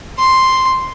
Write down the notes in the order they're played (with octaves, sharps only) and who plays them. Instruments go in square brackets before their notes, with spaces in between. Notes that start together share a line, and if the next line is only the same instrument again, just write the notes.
[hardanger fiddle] C6